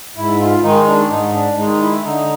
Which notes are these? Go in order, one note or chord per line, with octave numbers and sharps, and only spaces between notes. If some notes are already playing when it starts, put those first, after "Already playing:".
G#2 E4
F4
D#3 G#3 D#4
D4
G#2 D#4
D4
D#3 G#3 D#4
E4
D3 D#4